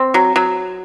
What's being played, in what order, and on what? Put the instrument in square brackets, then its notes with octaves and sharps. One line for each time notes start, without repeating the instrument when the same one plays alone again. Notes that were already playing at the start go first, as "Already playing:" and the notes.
Already playing: [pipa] C4
F#3
F#3